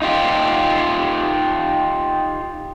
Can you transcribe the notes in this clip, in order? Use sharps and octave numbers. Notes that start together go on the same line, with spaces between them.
D#4 F4 G4